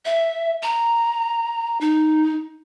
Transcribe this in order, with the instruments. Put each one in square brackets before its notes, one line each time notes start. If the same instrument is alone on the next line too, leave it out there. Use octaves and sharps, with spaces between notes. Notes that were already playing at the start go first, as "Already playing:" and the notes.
[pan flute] E5
A#5
D#4